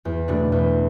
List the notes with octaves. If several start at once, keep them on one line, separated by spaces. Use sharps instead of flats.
E2
B2 A3 D4
E2